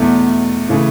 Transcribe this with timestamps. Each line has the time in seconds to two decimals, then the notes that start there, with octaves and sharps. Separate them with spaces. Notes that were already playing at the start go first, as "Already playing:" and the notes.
Already playing: E2 B2 A3
0.69 C#3 E3 A3